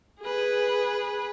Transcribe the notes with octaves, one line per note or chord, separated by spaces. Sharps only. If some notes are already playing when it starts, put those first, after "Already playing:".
G#4 B4